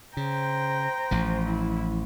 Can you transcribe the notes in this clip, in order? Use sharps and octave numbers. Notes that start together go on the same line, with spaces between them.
C#3 C5 G5 A#5
A1 F3
E4